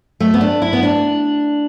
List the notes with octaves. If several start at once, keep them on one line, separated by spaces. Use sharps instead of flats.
A3
B3
D4
E4
B3
D4